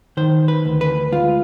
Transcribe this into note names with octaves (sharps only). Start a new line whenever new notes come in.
D#3 C5
B4
D2
B4
G#3 F4